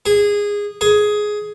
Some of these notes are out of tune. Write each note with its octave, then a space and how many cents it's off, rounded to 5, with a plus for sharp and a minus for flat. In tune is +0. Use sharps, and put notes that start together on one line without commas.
G#4 -15
G#4 +10